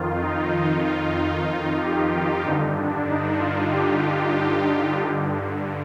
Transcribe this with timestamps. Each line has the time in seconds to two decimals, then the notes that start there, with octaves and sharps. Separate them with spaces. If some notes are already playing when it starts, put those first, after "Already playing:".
Already playing: F2 D#3 F4
0.21 D#4
0.54 D#4
0.85 F4
1.81 G4
2.12 F4
2.43 G2 D3 D#4
2.76 D4
3.08 D#4
3.39 F4
3.71 G4
4.03 F4
4.99 G2 D3